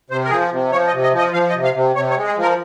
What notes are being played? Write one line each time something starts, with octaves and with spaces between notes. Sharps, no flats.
C3 C5
A#4
F3 G#4
C3
F3 C#5
D#5
C3
D#5
F3
D#5
F3 F5
D#5
C3
F5
C3
C3 C#5
C#5
G#3
G#4
F3
A#4